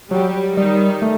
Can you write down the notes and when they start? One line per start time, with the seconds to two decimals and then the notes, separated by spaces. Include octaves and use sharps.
0.11 F#3 G3 G4
0.57 D#3 G3 D#4
1.02 A3